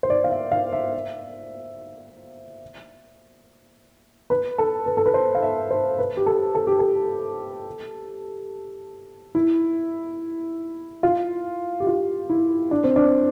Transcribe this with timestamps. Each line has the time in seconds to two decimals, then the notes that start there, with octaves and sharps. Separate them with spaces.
0.03 C5
0.10 D5
0.24 F5
0.30 E5
0.52 F5
0.73 E5
4.30 B4
4.58 A4
4.86 B4
4.97 A4
5.06 B4
5.14 C5
5.35 F5
5.42 E5
5.71 C5
5.99 B4
6.17 G4
6.26 A4
6.55 A4
6.67 G4
6.79 A4
9.35 E4
11.03 F4
11.80 G4
11.87 F4
12.30 E4
12.71 D4
12.84 C4
12.96 D4